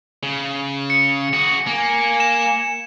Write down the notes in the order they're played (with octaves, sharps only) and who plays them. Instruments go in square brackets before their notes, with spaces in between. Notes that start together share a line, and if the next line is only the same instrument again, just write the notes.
[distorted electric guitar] C#3
[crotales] C#7
[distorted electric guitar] F#4 G#4
[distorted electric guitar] A#3 [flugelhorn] G#5
[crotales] E7